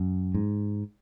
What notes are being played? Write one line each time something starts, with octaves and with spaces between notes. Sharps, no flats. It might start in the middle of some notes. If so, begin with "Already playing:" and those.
Already playing: F#2
G#2